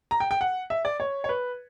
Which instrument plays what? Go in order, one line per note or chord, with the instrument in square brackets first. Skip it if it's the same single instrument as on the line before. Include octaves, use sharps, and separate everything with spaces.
[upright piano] A#5
G5
G5
F#5
E5
D5
C#5
C#5
B4